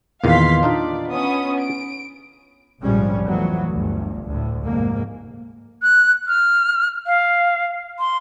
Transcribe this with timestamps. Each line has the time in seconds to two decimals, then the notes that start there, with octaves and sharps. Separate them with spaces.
0.24 E2 A#2 D#3 F5 C6 B6
0.63 D4 D#4 F4 D5
1.09 B3 C#4 D#6
1.60 D7
2.81 F1 A#1 G#2 F3 G3 C#4
3.25 F2 E3 F#3 A3 B3
3.68 G1 D2 G2
4.26 D2 A2
4.64 F1 G#2 A#3
5.82 F#6
6.28 F6
7.07 F5
7.99 C6